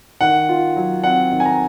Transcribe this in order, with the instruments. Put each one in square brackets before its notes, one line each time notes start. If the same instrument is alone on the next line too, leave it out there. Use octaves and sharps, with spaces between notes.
[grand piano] D#3 F#5
F4
F#3
C4 F#5
D#3
G#5
A#5